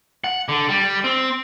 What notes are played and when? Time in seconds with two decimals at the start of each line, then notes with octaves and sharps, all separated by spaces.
0.24 F#5
0.49 D3
0.69 G3
1.04 C4